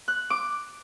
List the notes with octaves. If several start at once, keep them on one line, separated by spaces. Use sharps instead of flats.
F#6
D6